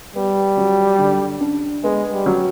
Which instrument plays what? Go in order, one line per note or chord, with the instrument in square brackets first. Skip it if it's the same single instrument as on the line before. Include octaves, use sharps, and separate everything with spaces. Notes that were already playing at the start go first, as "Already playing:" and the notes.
[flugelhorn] G3 [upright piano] B3
[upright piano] F#3
D3
D4
[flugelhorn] G#3 [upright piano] B3
[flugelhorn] G3
[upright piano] F#3